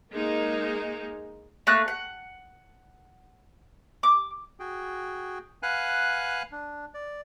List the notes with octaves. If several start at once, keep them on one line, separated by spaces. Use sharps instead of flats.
G#3 A#3 D#4
A3 A#3 F#6
F#5
D6
F#4 G#4 G5
B4 F5 F#5 G#5 F#6
D4
D5